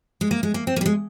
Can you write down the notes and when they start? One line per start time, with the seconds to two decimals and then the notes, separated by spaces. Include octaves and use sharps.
0.21 G#3
0.31 A#3
0.43 G#3
0.54 A#3
0.67 C4
0.76 A#3
0.81 G3
0.86 G#3